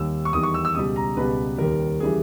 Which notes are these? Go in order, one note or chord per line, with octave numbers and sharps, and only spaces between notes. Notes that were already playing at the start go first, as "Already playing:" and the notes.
Already playing: D#2 D#3 G3 E6
C#6
E2 D#3 G3 D#6
C#6
E6
E6
C#2 B2 G3 D#6
A#5
C#2 B2 G3 B4
D#2 D#3 G3 A#4
C#3 E3 G3 G#4